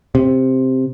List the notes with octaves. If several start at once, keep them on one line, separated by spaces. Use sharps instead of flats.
C3